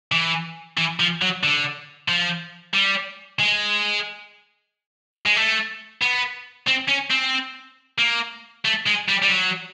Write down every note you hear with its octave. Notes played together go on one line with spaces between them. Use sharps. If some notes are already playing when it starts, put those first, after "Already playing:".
E3
E3
F3
F#3
D3
F3
G3
G#3
G#3
A3
B3
C4
C#4
C4
A#3
A3
G#3
G3
G3
F#3